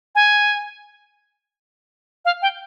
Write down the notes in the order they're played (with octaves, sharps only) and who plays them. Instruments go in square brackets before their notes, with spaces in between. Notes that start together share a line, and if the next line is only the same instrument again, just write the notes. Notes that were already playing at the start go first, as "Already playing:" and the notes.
[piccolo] G#5
F5
G5